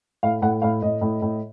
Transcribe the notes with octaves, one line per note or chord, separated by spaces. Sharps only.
A2 F5
A2 F#5
A2 F5
A2 D#5
A2
A2